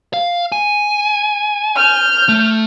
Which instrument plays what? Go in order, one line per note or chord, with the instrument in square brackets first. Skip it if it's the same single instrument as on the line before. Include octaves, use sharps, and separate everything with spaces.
[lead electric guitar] F5
G#5
[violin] F6 G6
[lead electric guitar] A3